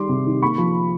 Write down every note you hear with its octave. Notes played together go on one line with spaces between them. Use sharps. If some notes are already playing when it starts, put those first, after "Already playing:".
Already playing: D#3 G3 C6 D6
C3
D#3
A#3 B5 C#6
F3